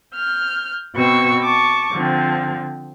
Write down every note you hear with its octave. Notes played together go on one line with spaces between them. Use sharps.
F6 G6
B2 B3 C4 C#6 E6
A5 C#6 D6
D3 F3 C4